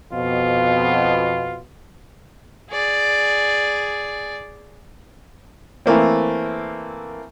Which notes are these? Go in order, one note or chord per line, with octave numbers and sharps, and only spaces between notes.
F2 B2 F4
G#4 D5
E3 A3 A#3 C4